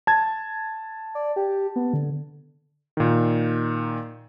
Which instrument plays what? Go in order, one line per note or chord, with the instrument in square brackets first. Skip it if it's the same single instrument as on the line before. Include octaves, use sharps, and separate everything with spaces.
[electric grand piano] A5 G#6
[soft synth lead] D5
G4
B3
D3
[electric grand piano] A#2 D#3